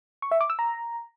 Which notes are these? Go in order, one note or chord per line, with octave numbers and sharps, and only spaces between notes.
C#6
E5
D6
E6
A#5